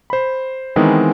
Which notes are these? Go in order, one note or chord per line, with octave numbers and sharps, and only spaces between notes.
C5 B5
D#3 E3 G#3 B3 C4 D#4